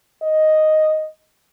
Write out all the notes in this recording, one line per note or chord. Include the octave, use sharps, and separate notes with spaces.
D#5